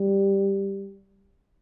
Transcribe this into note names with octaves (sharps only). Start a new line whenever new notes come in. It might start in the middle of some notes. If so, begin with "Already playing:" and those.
Already playing: G3